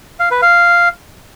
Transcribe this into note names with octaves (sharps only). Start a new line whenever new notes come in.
F5
B4
F5